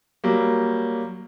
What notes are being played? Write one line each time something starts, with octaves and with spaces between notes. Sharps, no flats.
F#3 G3 A#3